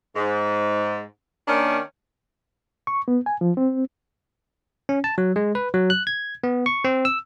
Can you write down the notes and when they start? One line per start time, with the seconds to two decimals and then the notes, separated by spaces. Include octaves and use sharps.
0.16 G#2
1.48 D#3 A#3 C#4 D4
2.87 C#6
3.08 B3
3.26 G#5
3.41 F3
3.57 C4
4.89 C#4
5.04 A5
5.18 F#3
5.36 G#3
5.55 B4
5.74 F#3
5.90 F#6
6.07 G#6
6.44 B3
6.66 C#6
6.84 C4
7.05 E6